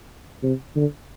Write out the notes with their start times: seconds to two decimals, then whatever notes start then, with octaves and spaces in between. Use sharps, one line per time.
0.43 C3
0.76 D3